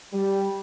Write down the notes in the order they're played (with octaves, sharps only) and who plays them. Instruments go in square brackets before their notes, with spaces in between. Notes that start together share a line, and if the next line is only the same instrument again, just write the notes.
[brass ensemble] G3